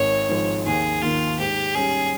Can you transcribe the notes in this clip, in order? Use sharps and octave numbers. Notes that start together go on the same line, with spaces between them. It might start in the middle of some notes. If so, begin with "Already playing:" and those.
Already playing: G#1 C#5
G#2 F3
D#2 G#4
D#3 A#3 F4
G#2 G4
G3 C#4 G#4